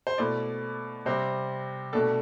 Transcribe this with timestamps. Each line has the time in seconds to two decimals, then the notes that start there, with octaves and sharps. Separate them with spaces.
0.07 C5
0.18 B2 A3 E4 D5
1.06 C3 G3 C4 C5
1.93 B2 A3 D4 A4